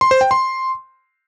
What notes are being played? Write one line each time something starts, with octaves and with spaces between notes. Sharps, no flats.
C6
C5
G5
C6